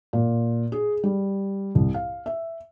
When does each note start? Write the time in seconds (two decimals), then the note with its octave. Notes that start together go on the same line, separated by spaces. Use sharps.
0.13 A#2
0.72 G#4
1.04 G3
1.75 C2
1.94 F5
2.26 E5